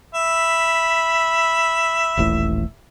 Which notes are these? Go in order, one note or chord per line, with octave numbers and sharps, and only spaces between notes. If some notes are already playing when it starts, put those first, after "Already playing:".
E5 B5
D#1 A1 A2